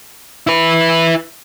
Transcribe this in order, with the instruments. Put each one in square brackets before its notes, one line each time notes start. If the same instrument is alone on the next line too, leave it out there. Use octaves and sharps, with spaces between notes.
[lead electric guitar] E4 B4